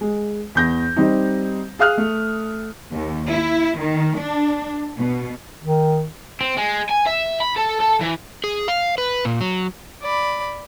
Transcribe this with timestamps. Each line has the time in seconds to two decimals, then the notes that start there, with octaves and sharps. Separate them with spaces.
0.01 G#3
0.55 E2 G6 A#6
0.96 G3 C4 D#4
1.79 G#4 F5 D#6 F6 F#6
1.98 A3
2.91 D#2
3.28 E4
3.79 D#3
4.19 D4
4.98 B2
5.62 D#3
6.41 C4
6.57 G#3
6.89 G#5
7.06 E5
7.40 B5
7.56 A4
7.80 A4
8.01 E3
8.44 G#4
8.68 F5
8.98 B4
9.25 A#2
9.41 F#3
10.02 D5 B5